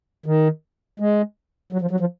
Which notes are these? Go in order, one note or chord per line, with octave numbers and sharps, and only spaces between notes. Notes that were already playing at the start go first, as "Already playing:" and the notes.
D#3
G#3
F#3
F3
F#3
F3